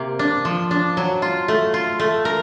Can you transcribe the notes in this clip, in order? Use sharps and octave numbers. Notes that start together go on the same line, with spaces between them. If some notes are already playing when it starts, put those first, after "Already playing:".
Already playing: C3 A#3
D4
F3
D4
F#3
F4
A3
F4
A3
A#4